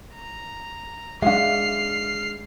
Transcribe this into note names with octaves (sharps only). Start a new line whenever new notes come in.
A#5
G#3 D4 E5 F5 F6 C7